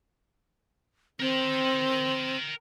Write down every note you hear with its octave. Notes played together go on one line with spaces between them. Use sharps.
C4 A#4 G5